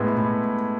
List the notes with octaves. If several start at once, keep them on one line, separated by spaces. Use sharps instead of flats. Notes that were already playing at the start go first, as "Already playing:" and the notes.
Already playing: A2 G#3 B3
A2